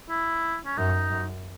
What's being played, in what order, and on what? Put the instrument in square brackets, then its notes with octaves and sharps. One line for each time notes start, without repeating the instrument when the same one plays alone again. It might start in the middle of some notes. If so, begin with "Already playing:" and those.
[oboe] E4
C#4
[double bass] F#2 [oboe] D#4
[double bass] F#2